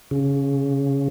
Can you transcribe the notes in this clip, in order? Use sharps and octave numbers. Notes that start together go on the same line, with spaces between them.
C#3